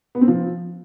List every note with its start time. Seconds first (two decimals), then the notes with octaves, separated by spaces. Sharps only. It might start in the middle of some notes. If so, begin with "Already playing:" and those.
0.15 B3
0.21 C4
0.28 F3